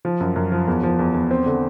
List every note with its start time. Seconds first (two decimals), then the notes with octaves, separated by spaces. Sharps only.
0.05 F3
0.20 F#2
0.36 F#2
0.52 F3
0.68 E2
0.83 F3
0.99 E2
1.14 E2
1.31 C4
1.46 D3